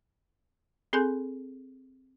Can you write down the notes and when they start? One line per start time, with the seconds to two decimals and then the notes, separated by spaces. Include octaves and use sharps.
0.93 C4 G#4 A4 G#5 C6 G6